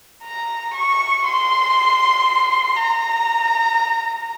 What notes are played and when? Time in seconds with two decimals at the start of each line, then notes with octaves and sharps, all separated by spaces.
0.23 A#5
0.74 C#6
1.25 C6
2.76 A#5